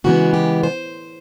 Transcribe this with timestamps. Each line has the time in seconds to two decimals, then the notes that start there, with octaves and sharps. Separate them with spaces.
0.04 C#3 E3 G#3 B3 F#4
0.34 G4
0.63 C5